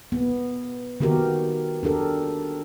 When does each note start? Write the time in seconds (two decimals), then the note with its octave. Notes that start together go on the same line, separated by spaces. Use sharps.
0.12 B3
1.00 D#3 B3 F#4 G4 A#4
1.83 D4 G4 A4 A#4